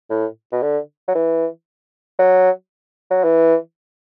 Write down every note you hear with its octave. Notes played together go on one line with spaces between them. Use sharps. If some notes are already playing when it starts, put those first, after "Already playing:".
A2
B2
D3
F#3
E3
F#3
F#3
E3